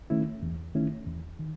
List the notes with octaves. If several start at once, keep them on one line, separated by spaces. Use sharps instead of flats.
D#3 A3 C#4 E4
E2
D#3 A3 C#4 E4
E2
D#3